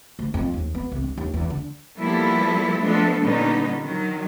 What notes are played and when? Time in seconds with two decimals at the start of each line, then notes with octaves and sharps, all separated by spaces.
0.19 D2
0.34 F2
0.54 D#2
0.75 B3
0.92 C2
1.03 G2
1.17 D#2
1.34 E2
1.50 D3
1.98 F3 G3 A#3 B3 E4 A4
2.80 F3 G#3 A3 B3 D4 A4
3.20 A#2 D3 G3 B3 C#4 D#4
3.84 D#3 F#3